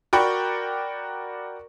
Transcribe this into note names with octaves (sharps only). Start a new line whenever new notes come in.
F#4 A#4 D5 G5 B5 C#6